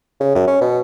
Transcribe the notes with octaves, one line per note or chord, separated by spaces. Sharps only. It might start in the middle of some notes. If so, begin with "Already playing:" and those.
C#3
F#2
C#4
B2